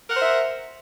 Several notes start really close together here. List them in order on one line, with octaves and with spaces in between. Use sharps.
A#4 F#5 C5 E5